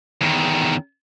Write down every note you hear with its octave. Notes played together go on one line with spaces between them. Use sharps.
E2 D#3